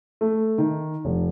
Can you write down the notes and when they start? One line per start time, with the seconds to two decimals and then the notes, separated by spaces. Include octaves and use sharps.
0.21 A3
0.58 D#3
1.05 F1